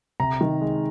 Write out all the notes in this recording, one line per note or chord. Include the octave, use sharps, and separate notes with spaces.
C3 A#5
D#3
G#3